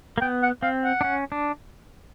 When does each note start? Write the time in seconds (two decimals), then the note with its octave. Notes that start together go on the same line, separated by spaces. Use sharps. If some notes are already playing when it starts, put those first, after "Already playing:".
0.18 A#3
0.21 B3 G5
0.43 F#5
0.63 C4 F5
0.84 F#5
1.01 D4
1.04 C#4
1.32 D4